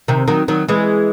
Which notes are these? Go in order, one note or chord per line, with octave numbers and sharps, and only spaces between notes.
C3 D#3
D#3 F#3
D#3 F#3
E3 G#3